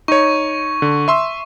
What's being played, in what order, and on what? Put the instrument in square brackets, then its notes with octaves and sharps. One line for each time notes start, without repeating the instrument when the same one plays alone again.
[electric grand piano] D#4 C#5 [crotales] C#6
[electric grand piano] D3
E5 C6 E6